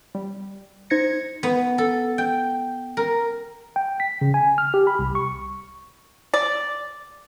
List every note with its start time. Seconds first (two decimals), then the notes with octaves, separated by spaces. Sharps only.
0.15 G3
0.90 D#4 C5 G#6 A#6 C#7
1.43 B3
1.78 A4
2.18 G5
2.97 A#4
3.76 G5
4.00 B6
4.21 C#3
4.34 G#5
4.58 F6
4.74 G4
4.87 B5
4.99 C2
5.15 C#6
6.34 D5